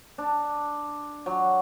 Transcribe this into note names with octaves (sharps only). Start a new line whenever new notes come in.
D4
F#3